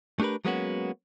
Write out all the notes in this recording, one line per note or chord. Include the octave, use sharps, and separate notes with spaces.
A3 D4 G4 A#4 B4
F#3 G#3 A#3 B3 C#4 F#4